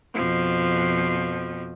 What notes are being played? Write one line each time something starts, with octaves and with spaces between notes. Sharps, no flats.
F2 B2 F3